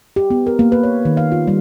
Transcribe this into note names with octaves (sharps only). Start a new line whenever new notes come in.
G4
B3
A#4
A#3
B4
C#5
D#3
F5
F4
G3